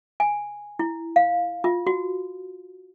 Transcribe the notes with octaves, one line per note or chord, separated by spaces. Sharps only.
G#5
E4
F5
F4
F#4